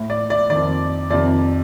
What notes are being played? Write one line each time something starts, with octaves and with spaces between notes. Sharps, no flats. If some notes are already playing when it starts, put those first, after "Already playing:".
Already playing: A2
D5
D5
D#3 D5
F2
F2 C3 D#3 D5